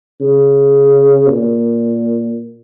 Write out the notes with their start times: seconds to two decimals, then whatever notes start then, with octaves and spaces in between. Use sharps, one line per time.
0.21 C#3
1.29 A#2